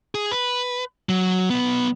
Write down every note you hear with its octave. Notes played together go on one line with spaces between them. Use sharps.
G#4
B4
F#3
B1 B3